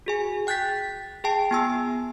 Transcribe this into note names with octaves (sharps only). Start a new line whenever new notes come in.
F#4 G#4 G#5
G5 F#6 G6 A6 B6
G#4 G5 A5
B3 F4 G#5 C6 E6